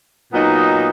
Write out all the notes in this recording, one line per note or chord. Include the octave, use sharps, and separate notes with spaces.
A#2 F#3 B3 D#4